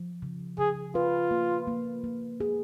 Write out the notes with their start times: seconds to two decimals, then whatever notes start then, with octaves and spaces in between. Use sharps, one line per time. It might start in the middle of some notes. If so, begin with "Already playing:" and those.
Already playing: F3
0.22 C#3
0.58 C#3 G#4
0.95 F4 B4
1.31 A#3
1.67 A#3
2.04 A#3
2.40 G#4